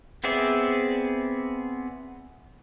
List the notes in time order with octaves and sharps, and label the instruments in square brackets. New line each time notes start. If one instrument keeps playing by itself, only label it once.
[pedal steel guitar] B3 C4 G#4 D5 E5